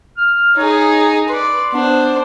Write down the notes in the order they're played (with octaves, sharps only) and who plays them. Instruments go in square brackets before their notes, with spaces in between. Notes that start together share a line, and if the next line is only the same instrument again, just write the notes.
[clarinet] F6
[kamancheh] D#4 G#4 [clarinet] C#5
[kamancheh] B4 D5 [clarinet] C6
[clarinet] B3 [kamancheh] D4 C5